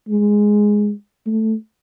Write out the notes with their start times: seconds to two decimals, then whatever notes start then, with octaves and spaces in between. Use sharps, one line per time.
0.08 G#3
1.26 A3